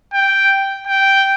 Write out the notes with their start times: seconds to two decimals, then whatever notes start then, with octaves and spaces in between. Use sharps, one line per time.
0.14 G5
0.87 G5